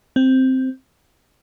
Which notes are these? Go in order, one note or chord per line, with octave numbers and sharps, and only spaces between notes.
C4